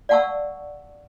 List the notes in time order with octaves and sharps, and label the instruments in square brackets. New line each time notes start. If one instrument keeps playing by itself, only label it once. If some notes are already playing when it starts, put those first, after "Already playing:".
[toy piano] D5 F5 F#5 A5 C#6 E6